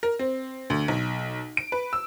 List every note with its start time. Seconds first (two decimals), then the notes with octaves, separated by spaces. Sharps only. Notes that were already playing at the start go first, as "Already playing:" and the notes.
0.03 A#4
0.19 C4
0.70 D2
0.88 B1
1.57 D7
1.72 B4
1.93 E6